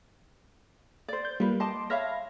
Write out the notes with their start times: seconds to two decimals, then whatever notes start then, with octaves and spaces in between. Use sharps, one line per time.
1.08 C5 D5
1.25 G6
1.40 G3 A#3 F4 B4
1.60 D#5 A5 C6 D6
1.90 C#5 E5 F5 B5 F6 A#6